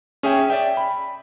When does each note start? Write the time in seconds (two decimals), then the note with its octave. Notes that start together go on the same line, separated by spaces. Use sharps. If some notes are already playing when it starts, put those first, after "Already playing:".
0.23 C#4 G#4 E5 G5
0.50 D5 E5 G5
0.77 B5